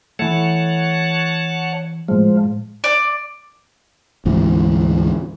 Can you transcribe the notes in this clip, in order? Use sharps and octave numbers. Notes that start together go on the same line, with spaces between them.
E3 A3 C#5 F#5 A5
A2 F3 G#3
D5
D2 G#2 E3